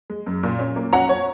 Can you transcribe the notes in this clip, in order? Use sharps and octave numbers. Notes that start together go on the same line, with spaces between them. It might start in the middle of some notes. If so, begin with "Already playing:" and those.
G#3
F#2
A#2
C#4
A#3
C#4 F#5 A#5
C#4 C#5